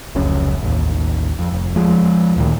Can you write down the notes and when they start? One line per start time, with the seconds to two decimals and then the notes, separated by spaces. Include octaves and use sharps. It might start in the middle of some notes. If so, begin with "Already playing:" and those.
0.15 F1 C#2 F#2 C#4
0.62 A1 D#2
1.39 F2
1.53 F1
1.76 E2 F3 G#3
2.36 D2 A#2 D#3